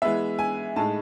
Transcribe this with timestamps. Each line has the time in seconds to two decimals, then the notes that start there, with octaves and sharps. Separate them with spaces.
0.02 E3 G#3 B3 E5
0.39 G#5
0.76 A2 G#3 D#4 A5